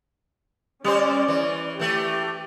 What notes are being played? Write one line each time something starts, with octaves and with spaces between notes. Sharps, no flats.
G3 C#4 C5 D5
E3
E3 A3 G4